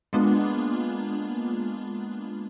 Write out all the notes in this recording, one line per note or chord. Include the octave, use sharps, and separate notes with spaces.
G#3 A#3 B3 D4 F4